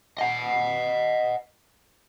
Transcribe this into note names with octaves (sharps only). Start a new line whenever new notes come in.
D#5 F#5